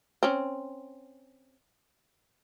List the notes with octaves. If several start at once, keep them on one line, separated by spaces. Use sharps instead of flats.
C4 C#4